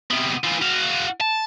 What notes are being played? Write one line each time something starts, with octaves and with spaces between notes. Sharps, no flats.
C3 B3
E3 F4
F#4 F5
A5